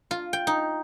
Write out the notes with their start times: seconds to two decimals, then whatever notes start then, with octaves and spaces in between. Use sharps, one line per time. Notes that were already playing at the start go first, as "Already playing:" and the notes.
0.11 F4
0.33 G5
0.47 D#4